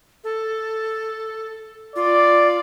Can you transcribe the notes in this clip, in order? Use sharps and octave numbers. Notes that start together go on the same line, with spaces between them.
A4
F4 D5